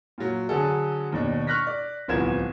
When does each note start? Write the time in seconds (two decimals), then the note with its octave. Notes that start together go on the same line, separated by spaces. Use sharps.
0.18 A#2 F#3
0.49 D3 F#3 G#4 A4
1.12 D#2 B2 D4
1.47 C#6 F6 F#6 A#6 B6
1.67 D5
2.08 D1 C2 F3 B3 G#6 E7